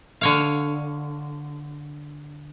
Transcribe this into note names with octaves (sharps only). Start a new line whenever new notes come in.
D3 C#5 F5